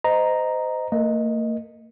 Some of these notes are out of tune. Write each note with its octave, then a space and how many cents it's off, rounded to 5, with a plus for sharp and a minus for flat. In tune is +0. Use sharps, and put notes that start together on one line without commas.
C5 -30 D#5 +0 A#5 +0
A#3 -45 A#4 +30 D#5 +0